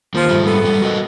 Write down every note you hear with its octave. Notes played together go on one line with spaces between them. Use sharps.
D#3 F3 A#3 A#4
G#2 G3 A3
B3 A4
G#2 G3
F#4 A#4 D#5